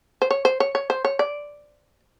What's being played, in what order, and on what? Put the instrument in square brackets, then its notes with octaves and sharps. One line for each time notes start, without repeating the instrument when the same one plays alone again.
[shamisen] C5
C#5
C5
C#5
C#5
C5
C#5
D5